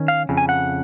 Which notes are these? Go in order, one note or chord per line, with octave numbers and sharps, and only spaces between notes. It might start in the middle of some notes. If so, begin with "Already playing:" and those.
Already playing: D#3 C#4
F5
F2 C#3
G#5
F#5